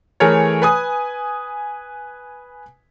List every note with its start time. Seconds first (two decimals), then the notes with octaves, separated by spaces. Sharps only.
0.20 E3 A3 G#4 A#4 C#5
0.62 B4 G#5 D#6